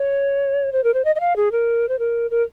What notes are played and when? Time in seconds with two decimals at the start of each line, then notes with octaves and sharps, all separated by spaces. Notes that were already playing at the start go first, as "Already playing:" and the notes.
Already playing: C#5
0.72 C5
0.84 A#4
0.94 C5
1.05 D#5
1.15 D#5
1.20 F5
1.36 G#4
1.52 A#4
1.89 C5
1.99 A#4
2.31 A#4